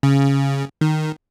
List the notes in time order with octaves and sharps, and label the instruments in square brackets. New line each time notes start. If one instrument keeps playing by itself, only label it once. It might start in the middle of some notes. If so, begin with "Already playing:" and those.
[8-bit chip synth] C#3
D#3